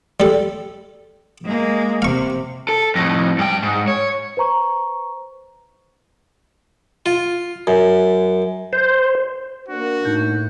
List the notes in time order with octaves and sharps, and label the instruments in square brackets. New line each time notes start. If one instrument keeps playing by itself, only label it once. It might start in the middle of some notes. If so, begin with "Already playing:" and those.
[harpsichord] G3 A4
[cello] G#3 A#3
[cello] C3 [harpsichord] F5 C#6
[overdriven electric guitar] A4
F2 A2
G2 G5
G#2
C#5
[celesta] B4 C5 A#5 C#6
[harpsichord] F4
F#2
[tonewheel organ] C5
[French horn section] A#3 D4 [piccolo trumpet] F#4
[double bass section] A2 [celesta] D#4 G6